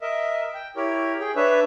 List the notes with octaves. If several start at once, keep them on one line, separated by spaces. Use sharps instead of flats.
A#4 D#5 E5
G5
E4 G4 A#4 C#5
G#4 G5
D4 B4 C#5 E5